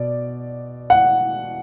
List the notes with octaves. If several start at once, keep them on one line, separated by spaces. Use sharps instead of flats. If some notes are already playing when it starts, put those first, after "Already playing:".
Already playing: B2 D5
F#5